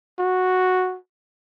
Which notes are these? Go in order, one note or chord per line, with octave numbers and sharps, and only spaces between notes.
F#4